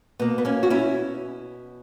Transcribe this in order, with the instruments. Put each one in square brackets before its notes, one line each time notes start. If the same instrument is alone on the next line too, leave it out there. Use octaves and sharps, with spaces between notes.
[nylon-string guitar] B2 A#3 B3
B3
A#3 C#4
F#4
C#4 E4